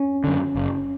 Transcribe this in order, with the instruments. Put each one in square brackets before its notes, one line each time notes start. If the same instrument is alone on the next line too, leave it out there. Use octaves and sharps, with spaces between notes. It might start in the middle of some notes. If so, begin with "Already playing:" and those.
Already playing: [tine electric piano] C#4
[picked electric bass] F#2 D3
F#1